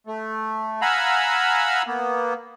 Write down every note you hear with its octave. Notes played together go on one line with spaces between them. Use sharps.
A3
F5 F#5 G#5 A#5 B5 E6
A#3 B3